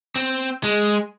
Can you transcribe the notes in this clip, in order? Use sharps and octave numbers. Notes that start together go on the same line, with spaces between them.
C4
G#3